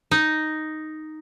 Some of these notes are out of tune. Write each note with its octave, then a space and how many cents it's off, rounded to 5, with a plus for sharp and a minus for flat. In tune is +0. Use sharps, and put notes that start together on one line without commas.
D#4 +0